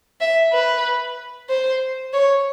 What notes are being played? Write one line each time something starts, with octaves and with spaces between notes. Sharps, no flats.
E5
B4
C5
C#5